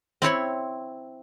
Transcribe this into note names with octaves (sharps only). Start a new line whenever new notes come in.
C4 E4 C#5 B5